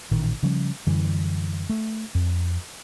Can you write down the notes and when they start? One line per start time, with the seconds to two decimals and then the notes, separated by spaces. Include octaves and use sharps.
0.11 A1 A#2 D#3
0.43 C#3 F3 G3 C#4
0.87 F#2 D3 E3 G3
1.69 A3
2.15 F2